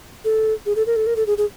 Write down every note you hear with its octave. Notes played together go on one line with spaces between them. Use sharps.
A4
G#4
A4
A#4
A4
A#4
A4
G#4
G#4